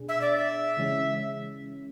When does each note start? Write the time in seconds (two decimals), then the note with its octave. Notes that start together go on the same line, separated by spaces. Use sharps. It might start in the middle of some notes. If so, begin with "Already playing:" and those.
Already playing: B2 D4 G#4
0.09 E5
0.21 D5
0.36 E5
0.77 C#3 E3 G#3 C#4